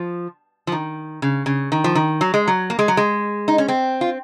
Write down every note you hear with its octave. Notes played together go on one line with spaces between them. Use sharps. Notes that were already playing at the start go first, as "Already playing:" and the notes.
Already playing: F3
F3
D#3
C#3
C#3
D#3
F3
D#3
F#3
G#3
F#3
A#3
G#3
F#3
G#3
D#4
C#4
C4
F4